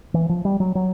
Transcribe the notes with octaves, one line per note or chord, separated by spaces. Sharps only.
E3
F3
G3
F#3
F#3